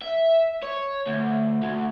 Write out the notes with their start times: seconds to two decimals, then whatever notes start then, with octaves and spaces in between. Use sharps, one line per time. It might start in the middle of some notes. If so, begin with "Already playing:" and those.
0.01 E5
0.63 C#5
1.06 D2
1.63 D2